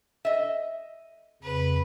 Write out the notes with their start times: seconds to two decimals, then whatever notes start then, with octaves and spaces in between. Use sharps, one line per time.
0.25 D#5 E5
1.43 F2 C#3 B4 B5